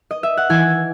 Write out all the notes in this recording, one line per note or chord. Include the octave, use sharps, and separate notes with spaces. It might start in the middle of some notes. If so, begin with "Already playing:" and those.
Already playing: C#5
D#5
E5
F#5
E3 G#5